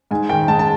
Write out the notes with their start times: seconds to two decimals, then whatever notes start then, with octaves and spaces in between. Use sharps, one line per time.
0.11 G#2 G#5
0.29 D#3 G5
0.48 G#2 A5
0.59 A5